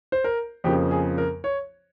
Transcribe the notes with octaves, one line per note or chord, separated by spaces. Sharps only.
C5
A#4
F2 C#3 F3 A#3 G4
G#4
A#4
C#5